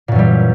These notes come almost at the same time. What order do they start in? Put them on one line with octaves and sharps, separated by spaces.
A#2 F#2 E3 G3